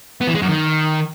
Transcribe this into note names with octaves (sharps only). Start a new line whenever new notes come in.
B3
E3
G#3
F#2
D#3